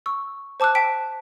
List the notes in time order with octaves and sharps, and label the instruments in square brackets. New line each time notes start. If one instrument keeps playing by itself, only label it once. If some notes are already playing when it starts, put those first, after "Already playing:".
[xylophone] C#6 E6
C5 A5 D6 E6 F#6
G5 A5 B6 D7